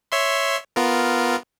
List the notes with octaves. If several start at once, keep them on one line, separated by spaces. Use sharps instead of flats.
C#5 E5 C6
B3 F4 A#4